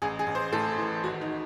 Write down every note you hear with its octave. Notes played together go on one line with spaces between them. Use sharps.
A1 G#4
G#4
A1
C5
A2 A4
E3
G#1 F#4
D#4